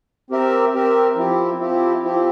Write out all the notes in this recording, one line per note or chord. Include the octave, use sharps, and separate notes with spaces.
C4 G4 A#4 E5
C4 G4 A#4 E5
F3 C4 E4 G4
F3 C4 E4 G4
F3 C4 E4 G4